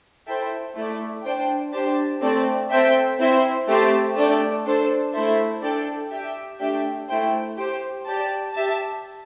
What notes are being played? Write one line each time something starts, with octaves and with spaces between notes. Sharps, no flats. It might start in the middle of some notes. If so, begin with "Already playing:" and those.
E4 A4 C5 E5 G5
A3 E4 A4 D5
D4 C5 G5
D4 G4 C5 A5
A3 C4 A4 D5
C4 A4 C5 E5 G5
C4 E4 C5 E5
A3 C4 G4 C5 A5
A3 D4 A4 D5 G5
D4 A4 C5
A3 E4 A4 C5 E5
D4 A4 D5 G5
G4 E5 G5
A3 D4 G4 E5 G5
A3 E4 C5 G5
G4 C5 G5
G4 D5 A5
G4 E5 A5